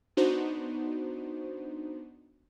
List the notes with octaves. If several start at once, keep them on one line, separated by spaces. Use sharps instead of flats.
B3 D4 D#4 F#4 C5